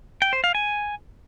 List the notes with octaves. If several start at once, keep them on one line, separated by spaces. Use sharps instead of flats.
G5
C5
F5
G#5